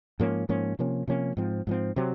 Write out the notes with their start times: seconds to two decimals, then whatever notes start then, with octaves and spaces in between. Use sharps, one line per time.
0.20 G#2 F3 A#3 C#4
0.49 G#2 F3 A#3 C#4
0.79 C3 F3 A#3 C#4
1.08 C3 F3 A#3 C#4
1.37 G#2 F3 C4
1.67 G#2 F3 C4
1.96 C3 F#3 C4